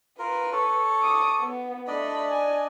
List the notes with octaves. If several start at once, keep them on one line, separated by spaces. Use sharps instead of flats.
F4 A#4 B4
A4 C#5
D6 D#6
B3
A3 D4 D5 D#5 B5
G#5